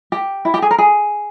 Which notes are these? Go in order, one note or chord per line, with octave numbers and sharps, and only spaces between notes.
G4
E4
G4
G#4
A#4
G#4